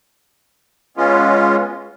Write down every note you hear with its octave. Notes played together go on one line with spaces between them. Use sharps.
G#3 B3 C#4 F4